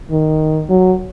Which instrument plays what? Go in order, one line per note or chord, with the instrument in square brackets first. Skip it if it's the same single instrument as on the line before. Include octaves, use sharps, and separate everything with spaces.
[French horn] D#3
F#3